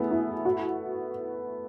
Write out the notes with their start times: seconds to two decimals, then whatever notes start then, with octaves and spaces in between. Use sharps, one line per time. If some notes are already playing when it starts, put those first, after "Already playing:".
Already playing: A3 B3 E4 G#4
0.11 E4
0.45 F#4